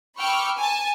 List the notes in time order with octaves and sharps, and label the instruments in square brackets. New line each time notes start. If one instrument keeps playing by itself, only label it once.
[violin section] G5 B5 C#6 D6 E6 F6
G#5 A5